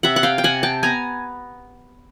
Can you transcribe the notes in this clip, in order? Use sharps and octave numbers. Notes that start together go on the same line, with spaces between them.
C3 E5 F#5
F#5
F5 G5
G5
C3 F#5 G#5
G5 A5
B3 G#5 A#5